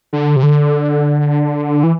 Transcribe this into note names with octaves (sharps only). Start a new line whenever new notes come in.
D3
C3
D3
E3